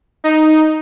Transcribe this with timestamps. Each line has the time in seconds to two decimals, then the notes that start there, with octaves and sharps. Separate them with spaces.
0.24 D#4